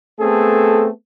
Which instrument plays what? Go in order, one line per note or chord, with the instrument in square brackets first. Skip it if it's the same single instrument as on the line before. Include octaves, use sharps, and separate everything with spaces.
[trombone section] A3 B3 C4 G#4 A4